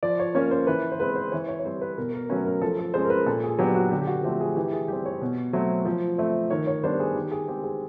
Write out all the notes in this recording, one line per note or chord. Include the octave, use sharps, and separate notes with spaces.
F3 D5
C#5
A#3 C#4 C#5
C5
E3 B4
C5
G#3 C4 B4
C5
E3 C#5
C#5
C#5
G3 C4 C5
B4
B2 A#4
A#4
F#3 A3 C#4 B4
A#4
F3 A4
A4
G#3 C#4 C5
A#4
B4
A#2 A4
G#4
F#3 B3 D4 G4
F#4
D3 G4
G4
F#4
F3 A3 C4 G4
G#4
E3 G4
G#4
G3 C4 G4
C#5
B2
F#3 A3 C4
F3
A3 C4
D#3 C#5
C#5
G3 B3 D4 C5
G#4
D#3 G4
G#4
G#3 C4 G4
G#4